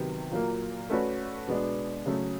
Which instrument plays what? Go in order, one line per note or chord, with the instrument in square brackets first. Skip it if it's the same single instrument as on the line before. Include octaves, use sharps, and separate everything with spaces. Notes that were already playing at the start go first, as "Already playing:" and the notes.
Already playing: [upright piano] C3 D#3 F#3 B3
A#2 F#3 A#3
A3 C#4 F#4 B4 D5
B2 G#3 B3 D4
C#3 F#3 A3 C#4